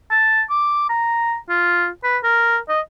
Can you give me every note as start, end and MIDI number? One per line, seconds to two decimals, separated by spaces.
0.11 0.42 81
0.50 0.88 86
0.90 1.36 82
1.50 1.88 65
2.04 2.18 71
2.24 2.57 70
2.69 2.81 75